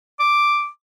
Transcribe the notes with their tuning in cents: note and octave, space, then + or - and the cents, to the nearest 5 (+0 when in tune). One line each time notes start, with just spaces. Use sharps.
D6 +0